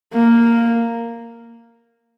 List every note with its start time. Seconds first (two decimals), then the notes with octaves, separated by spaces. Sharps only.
0.14 A#3